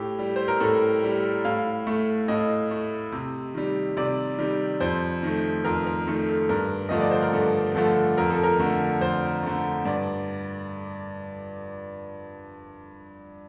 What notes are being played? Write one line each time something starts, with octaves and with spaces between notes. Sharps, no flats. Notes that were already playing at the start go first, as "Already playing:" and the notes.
Already playing: A2 G4
G3
C5
A#4
A2 A4
G3
A2 F5
A3
A2 D#5
A3
C3
D#3 G3
C3 D5
D#3 G3
F2 C5
D#3 A3
F2 A#4
A#4
D#3 A3 A4
A4
G2 A#4
D3 F3 A3 D#5
D5
C5
A#4
G2 A4
D3 F3 A3
F2 A#4
A4
A#4
D3 A3
F2 C5
D3 A3
G2 D5